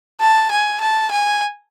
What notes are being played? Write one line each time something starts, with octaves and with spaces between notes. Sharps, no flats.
A5
G#5
A5
G#5